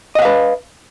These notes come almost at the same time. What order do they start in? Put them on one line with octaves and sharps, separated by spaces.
D#5 F#5 F5 B4